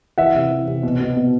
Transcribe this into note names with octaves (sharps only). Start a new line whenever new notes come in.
E3 E5 F#5
C3
E3
C3
B2
B2
B2